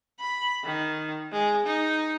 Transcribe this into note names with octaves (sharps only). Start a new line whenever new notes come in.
B5
D#3
G#3
D#4